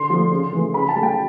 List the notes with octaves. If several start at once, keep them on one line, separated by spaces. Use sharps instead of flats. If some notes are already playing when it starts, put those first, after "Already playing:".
Already playing: D3 C6
F3 A3
C#3
E3 A3
C#3 B5
A5
F#3 A3
G5